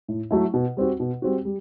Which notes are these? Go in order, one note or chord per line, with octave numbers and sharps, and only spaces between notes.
A2
F#3 A3 E4
B2
G3 C4 F#4
B2
G3 C4 F#4
G3